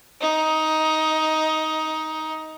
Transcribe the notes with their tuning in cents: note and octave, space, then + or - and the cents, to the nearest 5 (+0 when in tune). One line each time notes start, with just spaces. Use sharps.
D#4 +15